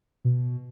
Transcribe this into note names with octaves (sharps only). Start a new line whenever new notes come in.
B2